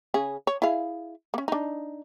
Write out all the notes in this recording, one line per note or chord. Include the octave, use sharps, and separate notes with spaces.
C#3 C#4 G#4
C#5
E4 G#4 F5
A#3 C#4
D4 D#4